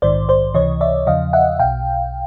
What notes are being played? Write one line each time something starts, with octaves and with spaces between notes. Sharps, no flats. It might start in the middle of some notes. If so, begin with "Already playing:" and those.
A#1 G#2 D#3 C5 D5
C5 D5
C#2 C3 E3 C#5 D#5
D5 E5
E2 C#3 F3 D#5 F5
E5 F#5
B1 B2 F5 G5